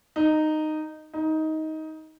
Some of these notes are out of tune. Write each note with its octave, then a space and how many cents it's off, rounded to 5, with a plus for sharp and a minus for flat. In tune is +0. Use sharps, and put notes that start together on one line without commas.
D#4 -10
D#4 +15